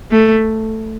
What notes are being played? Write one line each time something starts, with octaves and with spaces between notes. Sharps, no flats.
A3